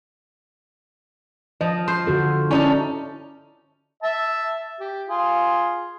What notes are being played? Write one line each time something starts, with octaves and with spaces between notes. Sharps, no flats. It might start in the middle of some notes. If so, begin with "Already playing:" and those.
F3 D#5
C5
D3 F#4 A4
C#4 D#4 E4 A4 D5
E5 A5
G4
F4 G#4